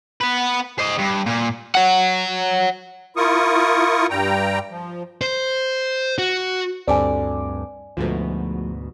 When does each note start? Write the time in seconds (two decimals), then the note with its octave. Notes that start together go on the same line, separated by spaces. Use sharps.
0.21 B3 B4
0.79 C5 D#5
0.98 G2
1.26 A#2
1.75 C#5 F#5
3.17 E4 F4 A#4 C#6 D#6
4.10 G2 G3 G5 A#5
4.70 F3
5.21 C5
6.18 F#4
6.88 D2 G2 C4 A4 D5 G#5 D6
7.97 D2 G#2 B2 F3 A3